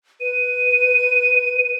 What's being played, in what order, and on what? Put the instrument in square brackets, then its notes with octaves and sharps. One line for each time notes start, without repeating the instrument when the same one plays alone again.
[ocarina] B4 [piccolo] D#7